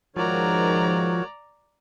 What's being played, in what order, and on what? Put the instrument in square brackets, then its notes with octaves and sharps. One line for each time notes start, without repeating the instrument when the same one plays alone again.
[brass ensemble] G#2 D#3 [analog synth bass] F3 [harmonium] F#4 A#4 C#5 [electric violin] D5 A#5